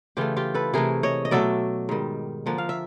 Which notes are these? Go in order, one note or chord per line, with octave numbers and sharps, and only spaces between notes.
C#3 E3 A3 F4 G4
F4 G4
A4 B4
C3 E3 A3 G#4 A#4
C#5 D#5
D#5
B2 F#3 A3 D5 E5
G#2 D#3 G3
D3 F3 A#3 F#5
F5
E5